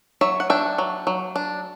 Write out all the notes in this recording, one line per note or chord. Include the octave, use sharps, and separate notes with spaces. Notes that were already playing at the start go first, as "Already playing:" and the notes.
F#3 C#5 E5
F#5
D4 E5 G5
F#3
F#3
D4